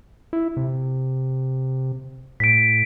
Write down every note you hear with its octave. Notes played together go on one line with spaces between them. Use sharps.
E4
C3
A2 B6 D7